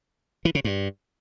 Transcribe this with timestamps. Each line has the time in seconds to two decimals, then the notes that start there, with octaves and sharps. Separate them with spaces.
0.45 E3
0.55 C#3
0.65 G2